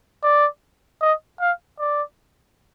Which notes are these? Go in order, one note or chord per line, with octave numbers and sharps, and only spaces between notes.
D5
D#5
F5
D5